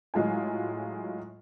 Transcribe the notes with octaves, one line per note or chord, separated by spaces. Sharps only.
A2 F#3 G#3 F4 G#5